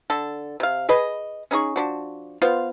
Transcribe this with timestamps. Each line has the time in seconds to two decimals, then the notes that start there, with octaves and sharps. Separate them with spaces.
0.10 D3 A4
0.60 C3 F5
0.89 G#4 B4 D#5
1.51 C#4 D#4 G#4 C#6
1.76 F3 D4 F#4
2.42 B3 F4 C5 F5